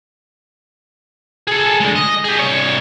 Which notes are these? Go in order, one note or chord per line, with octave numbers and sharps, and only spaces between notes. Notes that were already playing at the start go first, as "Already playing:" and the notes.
G#4 A4
D3 G#3
D#5
G4 G#4
C2 C#5